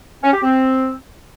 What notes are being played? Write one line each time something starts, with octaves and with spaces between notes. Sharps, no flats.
C#4
G4
C4